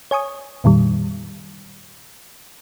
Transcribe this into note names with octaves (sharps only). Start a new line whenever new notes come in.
C#5 G#5 C#6 D#6
F2 A#2 D#3 G3